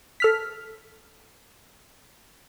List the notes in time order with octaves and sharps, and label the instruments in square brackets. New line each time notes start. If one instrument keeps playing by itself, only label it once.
[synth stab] A4 F6 B6